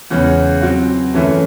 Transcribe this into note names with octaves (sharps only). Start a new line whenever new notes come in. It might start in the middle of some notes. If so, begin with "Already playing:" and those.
E2 C#3 G#3 C#4
F#3 C4 F#4
F#2 E3 A3 C#4